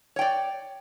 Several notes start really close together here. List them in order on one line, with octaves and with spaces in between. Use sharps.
C#5 G5 D5